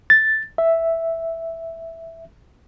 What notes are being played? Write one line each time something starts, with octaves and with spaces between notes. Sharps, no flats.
A6
E5